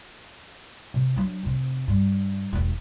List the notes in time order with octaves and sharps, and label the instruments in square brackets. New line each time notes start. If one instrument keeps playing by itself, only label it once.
[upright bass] C3
F#3 D4
F1 C3
G2
E1 D#2